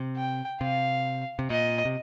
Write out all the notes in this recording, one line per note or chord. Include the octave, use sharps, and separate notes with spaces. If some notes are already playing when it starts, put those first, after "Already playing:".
Already playing: C3
G5
C3 F5
C3
A#2 D#5
C3